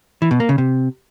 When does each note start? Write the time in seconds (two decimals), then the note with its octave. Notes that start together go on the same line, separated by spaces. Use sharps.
0.22 E3
0.31 B2
0.40 A#3
0.49 C#3
0.58 C3